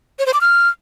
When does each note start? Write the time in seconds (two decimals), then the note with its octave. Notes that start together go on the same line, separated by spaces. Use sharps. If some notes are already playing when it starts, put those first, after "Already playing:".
0.19 C#5
0.26 C5
0.34 D6
0.41 F6